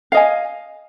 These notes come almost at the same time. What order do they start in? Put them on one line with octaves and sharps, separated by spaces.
F5 D#5 G#5